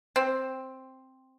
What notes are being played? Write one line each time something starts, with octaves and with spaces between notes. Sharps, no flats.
C4